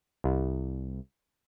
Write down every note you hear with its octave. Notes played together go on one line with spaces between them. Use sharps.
C2